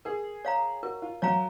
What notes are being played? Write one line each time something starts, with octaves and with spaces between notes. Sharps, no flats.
G#4 A#4
C#5 F5 A#5
F#4 A#4
F4
F#3 C#5 F5 A#5